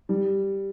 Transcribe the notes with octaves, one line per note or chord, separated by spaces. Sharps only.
G3